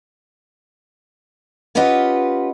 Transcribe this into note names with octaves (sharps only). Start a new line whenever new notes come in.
C#4 F4 G4 B4 D#5 F#5